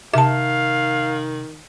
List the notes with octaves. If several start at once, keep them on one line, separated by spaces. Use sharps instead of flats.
C3 D#3 E5 F5 A5